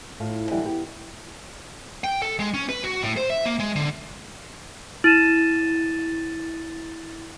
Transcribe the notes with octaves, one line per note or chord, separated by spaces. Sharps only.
A2 F4
D3 E3 F#3 G3 B3 D#4
B3 G4
G5
A4
G#3
C#4
B4
F#4
A2
C5
E5
A#3
G#3
D3
E4 A6 D#7 E7